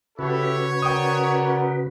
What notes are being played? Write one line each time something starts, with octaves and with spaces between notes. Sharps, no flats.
C#3 E4 F#4 G4 A4 B4 C#5
A#4 D5 F#5 G5 D#6